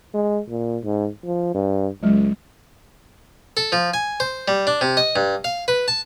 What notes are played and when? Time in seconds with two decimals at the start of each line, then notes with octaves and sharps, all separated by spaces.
0.14 G#3
0.49 A#2
0.84 G#2
1.25 F3
1.54 G2
2.03 C#2 F#3 G#3
3.57 A4
3.72 F3
3.94 G#5
4.20 C5
4.48 G3
4.67 D4
4.81 C3
4.97 D#5
5.16 G2
5.44 F5
5.68 B4
5.88 A5